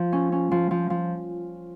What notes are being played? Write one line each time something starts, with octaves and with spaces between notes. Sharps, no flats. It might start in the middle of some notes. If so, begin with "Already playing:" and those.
Already playing: F3
C#4
C#4
F3
F3
F3